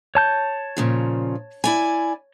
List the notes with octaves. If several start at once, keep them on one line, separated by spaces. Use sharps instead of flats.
C#5 A5 G6
A#2 C#3 F3
E4 D5 G#5